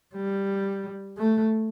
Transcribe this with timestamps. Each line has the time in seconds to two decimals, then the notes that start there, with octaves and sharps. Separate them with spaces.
0.15 G3
1.18 A3